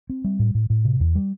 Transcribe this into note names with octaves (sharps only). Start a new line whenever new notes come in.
C4
G3
A2
A2
A2
C3
E2
G3